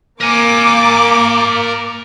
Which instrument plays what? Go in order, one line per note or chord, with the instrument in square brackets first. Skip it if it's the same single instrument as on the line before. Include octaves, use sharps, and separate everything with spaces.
[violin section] A#3 D6 [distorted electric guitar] A#4 G#5